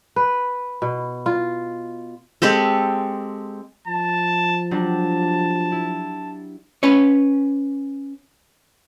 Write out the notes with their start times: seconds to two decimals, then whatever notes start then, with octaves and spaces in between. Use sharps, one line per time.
0.16 B4
0.82 B2
1.26 F4
2.42 G#3 C4 G4 A4
3.88 F3 A5
4.71 F#3 G3 D4 A5
5.72 E4
6.83 C#4 B4 C#5